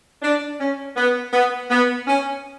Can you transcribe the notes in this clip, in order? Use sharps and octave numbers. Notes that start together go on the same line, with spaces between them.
D4
C#4
B3
B3
B3
C#4